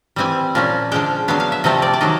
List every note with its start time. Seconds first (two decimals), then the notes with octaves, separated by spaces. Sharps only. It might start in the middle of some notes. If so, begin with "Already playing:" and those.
0.16 E3 G3 C4 G#5
0.55 A#2 F3 A#3 C#4
0.92 D3 F3 G#3 G5
1.28 D3 F#3 B3 F5
1.40 F5
1.52 E5
1.64 C3 F3 A3 C4 D#5
1.82 D5
1.93 D5
2.01 D#3 F#3 D#5